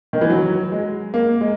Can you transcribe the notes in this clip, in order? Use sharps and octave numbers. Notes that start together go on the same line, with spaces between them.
D#3
E3
F#3
G#3
A#3
G#3